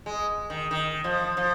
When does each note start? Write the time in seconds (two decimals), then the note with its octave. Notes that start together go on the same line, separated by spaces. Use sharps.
0.06 G#3
0.50 D#3
0.71 D#3
1.04 F3
1.37 F3